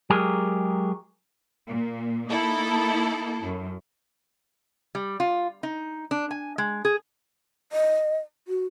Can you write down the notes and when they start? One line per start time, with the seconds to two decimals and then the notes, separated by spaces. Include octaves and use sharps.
0.10 F#3 G#3 G4 G#4 A#4
1.67 A#2
2.28 A#3 D#4 E4 A4
3.42 F#2
4.95 G3
5.20 F4
5.63 D#4
6.11 D4
6.31 G#5
6.58 G#3
6.85 G#4
7.72 D#5
8.48 F#4